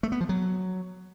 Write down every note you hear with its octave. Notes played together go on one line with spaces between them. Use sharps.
A3
B3
F3
F#3